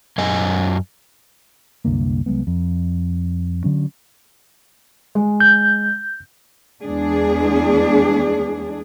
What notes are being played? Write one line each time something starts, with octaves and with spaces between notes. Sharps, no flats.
F#2 D#5 G#5
C2 F#2 D3 A#3
C2 F#3 G#3 B3
F2
D3 F#3 C#4
G#3
G6
E2 G#3 D4 G#4